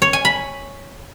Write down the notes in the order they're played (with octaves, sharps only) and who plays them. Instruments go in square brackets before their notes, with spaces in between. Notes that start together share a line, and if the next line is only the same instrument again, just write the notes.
[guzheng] C#5
G#5
B5